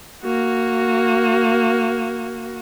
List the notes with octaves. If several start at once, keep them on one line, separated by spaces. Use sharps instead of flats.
A#3 F#4